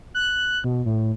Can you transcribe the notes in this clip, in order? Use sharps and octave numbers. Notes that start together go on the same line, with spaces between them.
F#6
B2
A2